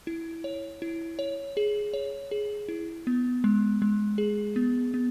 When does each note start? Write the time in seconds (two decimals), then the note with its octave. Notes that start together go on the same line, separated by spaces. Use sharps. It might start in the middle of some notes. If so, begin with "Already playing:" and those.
0.07 E4
0.44 C#5
0.82 E4
1.19 C#5
1.57 G#4
1.94 C#5
2.31 G#4
2.69 E4
3.07 B3
3.44 G#3
3.82 G#3
4.18 G#4
4.56 B3
4.94 B3